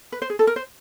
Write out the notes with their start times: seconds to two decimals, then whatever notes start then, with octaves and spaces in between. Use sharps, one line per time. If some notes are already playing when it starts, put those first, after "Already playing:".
0.12 B4
0.22 C5
0.30 G#4
0.39 A4
0.47 A#4
0.56 C5